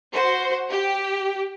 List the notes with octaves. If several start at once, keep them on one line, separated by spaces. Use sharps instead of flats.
F#4 C5
G4